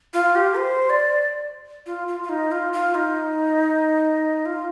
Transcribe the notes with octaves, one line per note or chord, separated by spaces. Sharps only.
F4
G4
C5
D5
F4
F4
F4
D#4
F4
F4
D#4
F4